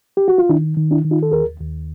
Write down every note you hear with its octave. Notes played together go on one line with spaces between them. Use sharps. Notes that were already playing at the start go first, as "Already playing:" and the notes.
G4
F#4
F4
D#3 D4 E4
D#3
D4 E4
D#3
D#4 F4
A4
D#2 G#4 A#4
D#2